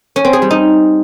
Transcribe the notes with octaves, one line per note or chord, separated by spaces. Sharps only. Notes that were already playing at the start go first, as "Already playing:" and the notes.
C#4
C4
G#4
G3
D#4